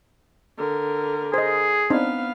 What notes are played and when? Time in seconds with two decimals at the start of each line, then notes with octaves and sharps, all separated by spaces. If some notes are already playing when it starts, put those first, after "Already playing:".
0.58 D3 A#4
1.34 G#4 C5 D#5
1.90 B3 C4 D4 D#4 F5